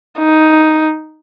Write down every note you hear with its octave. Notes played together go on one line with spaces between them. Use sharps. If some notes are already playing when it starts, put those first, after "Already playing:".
D#4